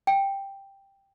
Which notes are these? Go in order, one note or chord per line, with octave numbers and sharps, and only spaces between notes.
G5